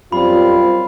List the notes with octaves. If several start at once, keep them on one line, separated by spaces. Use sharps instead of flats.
F#2 G3 C4 F4 B5